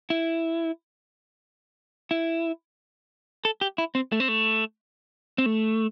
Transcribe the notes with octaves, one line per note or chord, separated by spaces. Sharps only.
E4
E4
A4
G4
E4
C4
A3
C4
A3
C4
A3